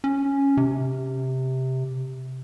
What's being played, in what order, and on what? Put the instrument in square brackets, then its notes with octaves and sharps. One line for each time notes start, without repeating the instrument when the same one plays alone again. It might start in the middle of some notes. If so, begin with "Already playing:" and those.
[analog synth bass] C#4
C3